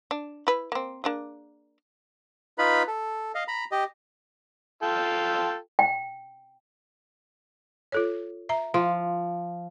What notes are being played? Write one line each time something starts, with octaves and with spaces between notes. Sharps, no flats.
D4
E4 B4
A#3 C4
A#3 D4 G#4
D#4 F4 B4 B5
A4
D#5 F5
A#5 B5
G4 D#5
F4 A4 G5
G5
F4 A4 C#5
E5 A#5
F3 F5